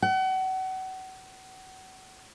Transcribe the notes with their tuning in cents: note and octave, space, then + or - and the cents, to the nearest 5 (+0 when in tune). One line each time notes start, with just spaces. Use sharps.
F#5 +30